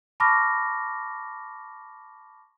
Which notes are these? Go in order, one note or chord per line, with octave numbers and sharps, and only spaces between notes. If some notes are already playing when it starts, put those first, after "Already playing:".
A5 B5 C#6 D6 F6 A#6